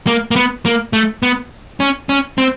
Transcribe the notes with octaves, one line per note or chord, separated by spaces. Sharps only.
A#3
A#3
B3
A#3
A3
B3
C#4
C#4
C4